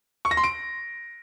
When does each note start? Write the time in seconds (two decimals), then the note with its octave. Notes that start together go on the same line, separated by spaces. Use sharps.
0.25 C#6
0.31 A#6
0.37 C6
0.44 D7